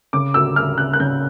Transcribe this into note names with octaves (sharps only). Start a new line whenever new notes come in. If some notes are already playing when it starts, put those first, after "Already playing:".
C#3 D6
D2 E6
D2 F6
C#3 F#6
F#6
C#3 G6